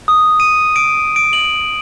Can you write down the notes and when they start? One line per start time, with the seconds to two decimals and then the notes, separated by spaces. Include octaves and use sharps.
0.08 D#6
0.40 D#7
0.76 D7
1.16 D7
1.33 F#7